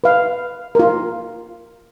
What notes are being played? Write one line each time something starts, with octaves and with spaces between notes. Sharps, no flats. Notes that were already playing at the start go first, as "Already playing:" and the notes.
B4 F5
F4 A#4